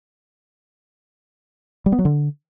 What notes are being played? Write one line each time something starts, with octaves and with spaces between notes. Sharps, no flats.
G3
B3
F#3
D3